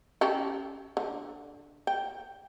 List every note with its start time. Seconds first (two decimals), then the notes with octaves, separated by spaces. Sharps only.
0.21 C#4 G4 A4
0.97 D3
1.87 G5